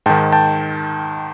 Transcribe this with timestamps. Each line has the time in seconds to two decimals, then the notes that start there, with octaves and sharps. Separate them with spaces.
0.06 G#2 D#3 G5 A5
0.32 G5 A5